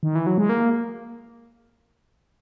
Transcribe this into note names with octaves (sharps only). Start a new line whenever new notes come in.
D#3
E3
F#3
G#3
A#3